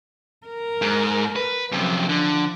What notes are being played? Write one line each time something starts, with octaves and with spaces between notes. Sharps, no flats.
A#4
G#2
B4
F#2 C3 F3
D3